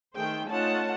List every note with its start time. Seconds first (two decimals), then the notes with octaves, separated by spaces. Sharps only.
0.15 D#3 A3 G#4 C5 G5
0.47 A3 C#4 D#4 F4 F#5 A5